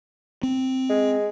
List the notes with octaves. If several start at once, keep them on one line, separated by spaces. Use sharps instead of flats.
C4
G#3